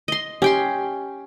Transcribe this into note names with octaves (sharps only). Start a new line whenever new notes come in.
D#5 C6
C#4 G4 G5 C6